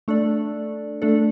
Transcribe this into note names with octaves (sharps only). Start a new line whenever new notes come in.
A3 D4 A4 D5
A3 D4 A4 D5